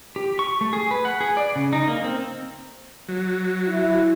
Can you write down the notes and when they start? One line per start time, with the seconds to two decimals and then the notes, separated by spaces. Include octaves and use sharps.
0.16 G4
0.39 C#6
0.61 A3
0.73 G#4
0.91 B4
1.05 F#5
1.21 G#4
1.37 D5
1.56 C#3
1.73 D#4
1.88 A#3
2.04 C4
3.08 F#3
3.68 E4